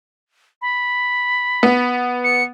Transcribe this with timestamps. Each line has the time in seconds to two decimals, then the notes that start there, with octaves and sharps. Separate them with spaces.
0.62 B5
1.63 B3
2.24 C#7